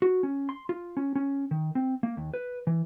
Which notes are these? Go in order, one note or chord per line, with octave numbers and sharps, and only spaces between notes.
F#4
C#4
C6
F4
C#4
C#4
D#3
C4
A#3
D#2
B4
E3